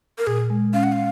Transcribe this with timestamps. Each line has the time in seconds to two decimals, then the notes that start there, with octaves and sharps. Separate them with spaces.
0.18 A#4
0.27 A#2 G#4
0.50 G#3
0.74 C#4 F5
0.83 F#5
0.92 F5